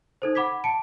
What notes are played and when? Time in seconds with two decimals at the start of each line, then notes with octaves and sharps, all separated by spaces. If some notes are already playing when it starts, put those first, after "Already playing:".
0.22 D#4 A4 C5
0.35 F#5 B5 D6 G#6 B6
0.64 A5 C#7 D7